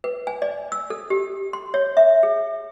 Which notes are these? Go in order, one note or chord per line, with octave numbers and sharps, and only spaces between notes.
B4
G#5
D5
E6
A4
G4
C6
C#5
E5
G#4